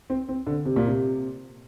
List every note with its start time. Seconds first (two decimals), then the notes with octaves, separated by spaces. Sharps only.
0.10 C4
0.29 C4
0.47 D3
0.65 C3
0.76 A#2
0.86 C3